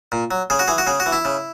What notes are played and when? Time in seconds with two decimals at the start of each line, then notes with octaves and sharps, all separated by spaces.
0.12 A#2
0.31 F#3
0.50 C#3 G#4
0.59 F#4
0.68 E3 G#4
0.78 F#4
0.87 C#3 G#4
1.00 F#4
1.06 E3
1.12 E4
1.25 C#3